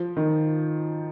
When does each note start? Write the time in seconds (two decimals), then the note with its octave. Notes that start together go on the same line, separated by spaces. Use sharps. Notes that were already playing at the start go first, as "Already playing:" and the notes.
Already playing: F3
0.17 D#3